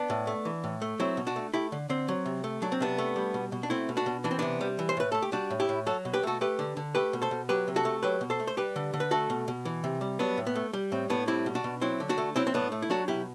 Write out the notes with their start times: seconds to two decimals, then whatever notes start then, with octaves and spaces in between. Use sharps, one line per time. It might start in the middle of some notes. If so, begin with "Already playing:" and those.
Already playing: B3 D4
0.10 A2
0.27 A3
0.45 E3
0.64 A2
0.82 A3
1.00 F#3 C4 E4
1.17 B2
1.27 D4 F#4
1.36 A3
1.54 A3 E4 G4
1.72 D3
1.89 D3 C4
2.08 F#3
2.26 C3
2.44 A3
2.62 F#3 D4
2.72 C4
2.80 C3 B3 D4
2.98 A3
3.16 G3
3.34 B2
3.52 B2
3.63 D4
3.70 A3 C4 E4
3.89 B2
3.97 D4 F#4
4.06 B2
4.24 E3 D4
4.31 C4
4.39 C3 B3 D4
4.61 G3
4.79 E3
4.89 C5
4.97 A2 B4
5.12 A3 A4
5.22 G4
5.32 G3 D4 F#4
5.51 A2
5.60 E4 G4
5.69 A2
5.86 F#3 F#4 A4
6.05 B2
6.14 G4 B4
6.23 A3 F#4 A4
6.41 A3 G4 B4
6.59 D3
6.77 D3
6.95 A3 G4 B4
7.13 B2
7.22 A4 C5
7.31 B2
7.49 F#3 G4 B4
7.68 C3
7.76 F#4 A4
7.85 A3
8.03 F#3 G4 B4
8.21 B2
8.30 A4 C5
8.40 A3
8.47 C5
8.57 G3 G4 B4
8.76 D3
8.94 D3
9.00 B4
9.11 A3 F#4 A4
9.30 B2
9.48 B2
9.65 E3
9.84 C3
10.01 G3
10.19 F#3 B3 D4
10.37 A2
10.47 B3
10.56 A3
10.73 G3
10.92 A2 C4
11.10 A2 B3 D4
11.28 G3 C4 E4
11.46 B2
11.55 D4 F#4
11.64 B2
11.81 F#3 C4 E4
12.00 D3
12.09 D4 F#4
12.18 A3
12.36 F#3 C4 E4
12.47 C4
12.54 A2 B3 D4
12.72 A3
12.82 E4
12.90 F#3 D4 F#4
13.08 B2 E4 G4